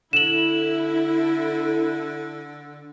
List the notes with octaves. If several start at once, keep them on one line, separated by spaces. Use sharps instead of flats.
D3 E4 A4 E7 F#7